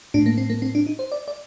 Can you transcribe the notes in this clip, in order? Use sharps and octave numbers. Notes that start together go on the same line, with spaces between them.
A2 D4
A#3
C4
A#3
C4
D4
D#4
C5
D5
D5